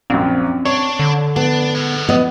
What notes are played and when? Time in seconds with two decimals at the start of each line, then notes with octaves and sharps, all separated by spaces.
0.10 A#1 F#2 C4
0.65 D4 C#5
0.99 D3
1.36 B3 D4
1.75 A2 G#3
2.09 B3 D#5